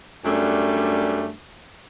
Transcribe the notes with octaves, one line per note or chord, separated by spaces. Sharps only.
F#2 G3 A3 D4